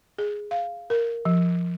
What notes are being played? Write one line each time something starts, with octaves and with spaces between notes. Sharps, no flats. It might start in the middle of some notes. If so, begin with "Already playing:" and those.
G#4
F5
A#4
F3